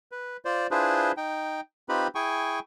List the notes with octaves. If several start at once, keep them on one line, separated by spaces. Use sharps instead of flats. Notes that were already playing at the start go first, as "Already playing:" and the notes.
B4
F4 C5 D5
D4 E4 F4 G#4 B4 C5
D#4 G5
C4 D#4 F4 G4 B4 B5
E4 G#4 G5 G#5 C#6